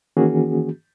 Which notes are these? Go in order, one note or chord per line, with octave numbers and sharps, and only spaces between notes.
D#3 E3 A#3 C#4 F#4 G#4